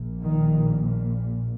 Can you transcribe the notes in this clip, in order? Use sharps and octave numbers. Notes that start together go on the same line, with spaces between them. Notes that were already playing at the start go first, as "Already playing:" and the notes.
Already playing: A#1 A#2
D#3